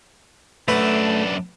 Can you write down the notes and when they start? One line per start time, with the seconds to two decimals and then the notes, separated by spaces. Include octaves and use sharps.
0.68 F#2 A3 D4 B4 F#5